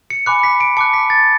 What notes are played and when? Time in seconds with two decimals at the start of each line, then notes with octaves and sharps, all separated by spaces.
0.10 C#7
0.26 G#5 B5 D6 F#6 C#7
0.43 B6
0.61 D7
0.77 A5 D6 F#6 C#7
0.93 B6
1.10 A6